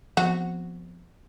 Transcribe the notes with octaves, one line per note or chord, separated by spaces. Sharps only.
F3 B3 C4 F#4